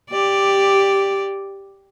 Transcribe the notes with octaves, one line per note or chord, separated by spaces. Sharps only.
G4 D5